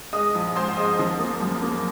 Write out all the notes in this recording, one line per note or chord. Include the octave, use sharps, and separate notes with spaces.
G#3 D#5 D#6
A#1
G#2 C5 C6
G#3 D#5 D#6
F3
A#3
F#2
A#3